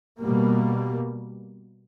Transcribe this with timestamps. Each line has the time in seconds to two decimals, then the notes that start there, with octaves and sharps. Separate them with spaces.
0.19 B2 G3 A#3